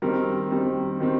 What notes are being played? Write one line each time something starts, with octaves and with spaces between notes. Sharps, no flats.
D#3 G3 C4 A#4
D#3 G3 C4
D#3 G3 C4